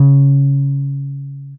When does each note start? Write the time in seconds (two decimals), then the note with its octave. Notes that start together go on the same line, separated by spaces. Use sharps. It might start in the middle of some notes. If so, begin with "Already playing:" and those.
Already playing: C#3